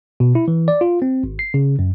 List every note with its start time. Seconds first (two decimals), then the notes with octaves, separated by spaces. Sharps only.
0.20 B2
0.35 E4
0.48 E3
0.68 D5
0.81 F4
1.02 C4
1.24 G#1
1.39 C7
1.54 C#3
1.79 F#2